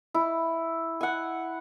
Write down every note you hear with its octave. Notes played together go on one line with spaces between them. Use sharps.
E4
F#5 G#5